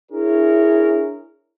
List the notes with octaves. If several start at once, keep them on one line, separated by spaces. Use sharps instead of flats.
D4 E4 G#4 A#4 C#5